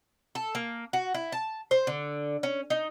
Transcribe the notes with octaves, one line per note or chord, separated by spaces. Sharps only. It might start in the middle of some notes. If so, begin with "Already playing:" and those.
A4
A#3
F#4
E4
A5
C5
D3
C#4
D#4